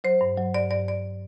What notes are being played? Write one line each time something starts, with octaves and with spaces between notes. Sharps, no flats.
F#3 C5
G2
F#3
G2 D5
G2 D5
G2 D5